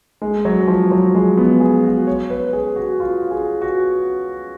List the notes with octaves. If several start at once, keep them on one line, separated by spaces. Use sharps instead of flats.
G#3
F#3
F3
F#3
G#3
B3
G#4
F#4
C#5
B4
G#4
F#4
F4
G#4
F#4